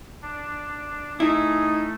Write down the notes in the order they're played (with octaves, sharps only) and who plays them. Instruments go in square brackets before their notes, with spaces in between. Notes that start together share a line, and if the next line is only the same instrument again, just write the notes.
[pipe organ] D4
[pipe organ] A3 [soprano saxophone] D#4 [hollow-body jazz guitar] E4 [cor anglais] G#4